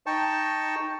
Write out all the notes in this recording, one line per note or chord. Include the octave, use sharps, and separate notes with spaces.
D#4 G5 A5 C#6